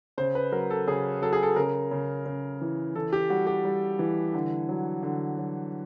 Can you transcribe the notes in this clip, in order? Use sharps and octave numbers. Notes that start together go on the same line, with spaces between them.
C#3 C5
B4
F#3 A#4
A4
C#3 G#4
F#3 A4
G#4
A4
C#3 A#4
C#3
C#3
E3
E3 A4
G4
G3 F#4
G4
G3
E3
D3
F#3
D3
F#3